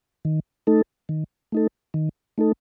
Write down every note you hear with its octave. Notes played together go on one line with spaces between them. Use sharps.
D#3
A3 D#4 A4
D#3
A3 D#4 A4
D#3
A3 D#4 A4